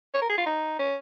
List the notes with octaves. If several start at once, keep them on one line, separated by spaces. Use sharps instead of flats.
C#5
A#4
G#4
F4
D#4
C#4